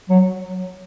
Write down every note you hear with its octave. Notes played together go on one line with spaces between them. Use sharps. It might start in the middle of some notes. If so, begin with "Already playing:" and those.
F#3